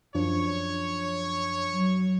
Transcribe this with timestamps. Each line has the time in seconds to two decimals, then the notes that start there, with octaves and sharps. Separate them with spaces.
0.15 F#2 F3 D4 C#5
1.72 F#3